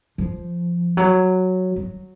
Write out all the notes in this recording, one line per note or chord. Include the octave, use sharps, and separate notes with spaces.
F3
F#3
F#3